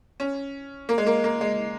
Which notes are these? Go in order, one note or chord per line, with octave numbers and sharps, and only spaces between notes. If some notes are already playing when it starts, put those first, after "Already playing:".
C#4
A#3
G#3
A#3
A#3
G#3